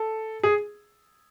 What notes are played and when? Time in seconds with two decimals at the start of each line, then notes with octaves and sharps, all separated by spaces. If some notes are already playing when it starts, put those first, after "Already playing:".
Already playing: A4
0.43 G#4